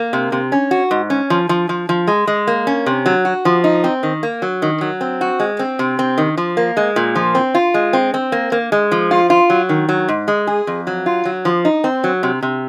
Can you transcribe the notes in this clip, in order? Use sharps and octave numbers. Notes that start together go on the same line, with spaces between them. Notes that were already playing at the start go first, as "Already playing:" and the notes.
Already playing: A#3
C3
C3
C#4
F#4
G#2
C#4
F3
F3
F3
F3
G#3
G#3
A#3
C#4
C3
F#3
F#4
F3
D#4
C4
D#3
A#3
F#3
D#3
F#3
C4
F#4
G#3
C4
C3
C4
D#3
F3
A#3
G#3
A#2
F3
C4
F4
G#3
C4
C4
A#3
A#3
G#3
F3
F4
F4
F#3
D#3
F#3
G#2
G#3
G#4
F2
F#3
F4
F#3
F3
D#4
C4
F#3
C3
C3